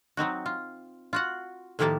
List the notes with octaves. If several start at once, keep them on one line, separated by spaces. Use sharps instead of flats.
F#3 C4 D#4 F#4
F4
F4 F#4 F#5
A2 D#3 F3 A#3 G4 A5